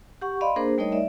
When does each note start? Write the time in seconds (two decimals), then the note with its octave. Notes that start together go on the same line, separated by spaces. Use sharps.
0.21 G4 F#5 C#6
0.41 D5 D#5 F5 B5 C6
0.56 A#3 D4 G#4 A#4 C5
0.78 G3 A3 D#4 A#4 C#5 D#5
0.92 D5 E5